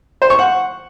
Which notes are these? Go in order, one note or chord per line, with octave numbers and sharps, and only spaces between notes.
C5
C#6
F#5